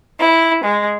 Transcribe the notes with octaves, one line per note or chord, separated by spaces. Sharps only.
E4
G#3